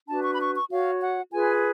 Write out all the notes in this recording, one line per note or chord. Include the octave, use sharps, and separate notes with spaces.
D4 F#4 B4 A5
C#6
B5
C#6
C#6
F#4 C#5 F5
F#5
F4 G#4 B4 G#5